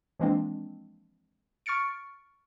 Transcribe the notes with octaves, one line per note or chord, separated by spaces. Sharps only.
E3 F3 G#3 A#3 C4 D4
C#6 F6 A6 C#7 D7